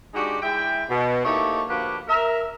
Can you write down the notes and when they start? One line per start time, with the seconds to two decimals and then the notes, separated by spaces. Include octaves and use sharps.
0.14 G#3 D4 D#4 F#4 G4
0.42 G#3 E4 E5 G5
0.89 B2
1.25 A3 A#3 D#4 E4 G4 C#5
1.68 D3 F3 A#3 F#4 G4 B4
2.08 A#4 E5